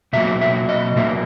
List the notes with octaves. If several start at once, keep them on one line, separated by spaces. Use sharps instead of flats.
B2 F#3 A#3 E5
E5
D#5
B2 F#3 A#3 E5